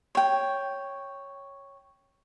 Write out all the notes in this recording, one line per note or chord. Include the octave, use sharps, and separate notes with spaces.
C#5 G5